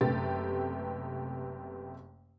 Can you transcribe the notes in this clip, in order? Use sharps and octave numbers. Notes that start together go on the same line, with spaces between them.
F#1 C3 A3 B3 G4 A6